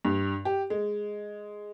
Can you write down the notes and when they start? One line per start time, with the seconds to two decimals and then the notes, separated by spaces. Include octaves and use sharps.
0.05 G2
0.45 G4
0.70 G#3